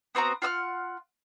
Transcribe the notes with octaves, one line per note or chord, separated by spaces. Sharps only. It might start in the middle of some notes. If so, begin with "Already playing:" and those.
B3 C4 F#4 A#5
F4 F#5 E6 F6